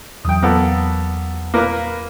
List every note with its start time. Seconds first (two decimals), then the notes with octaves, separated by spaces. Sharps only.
0.25 E2 F#3 G5 D#6
0.43 A#3 B3 A4
1.54 A#3 A#4 B4